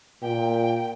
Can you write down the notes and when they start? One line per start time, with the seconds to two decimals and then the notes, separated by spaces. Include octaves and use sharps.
0.22 A#2 G5